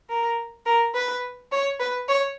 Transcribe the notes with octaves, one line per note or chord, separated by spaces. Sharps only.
A#4
A#4
B4
C#5
B4
C#5